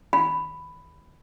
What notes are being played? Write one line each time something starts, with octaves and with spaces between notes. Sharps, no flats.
B5